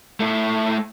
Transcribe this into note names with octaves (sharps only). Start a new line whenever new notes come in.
A3 E4